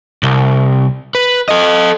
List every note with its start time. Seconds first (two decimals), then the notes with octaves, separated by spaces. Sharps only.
0.23 C2
1.15 B4
1.49 A4 D#5